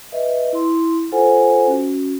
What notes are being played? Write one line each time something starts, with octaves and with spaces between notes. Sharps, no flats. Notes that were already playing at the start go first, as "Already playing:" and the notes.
B4 D#5 E5
E4 C6
F4 A4 C5 F#5 G#5
C#4 F#4